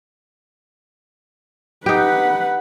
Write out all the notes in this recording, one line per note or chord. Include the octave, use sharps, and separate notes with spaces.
D#4 G4 B4 F#5